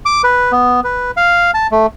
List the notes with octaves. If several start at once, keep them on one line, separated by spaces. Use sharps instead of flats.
D6
B4
B3
B4
F5
A5
A3